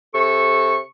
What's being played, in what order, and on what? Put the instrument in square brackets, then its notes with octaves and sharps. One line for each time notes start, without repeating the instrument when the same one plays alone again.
[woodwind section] C3 A4 C#6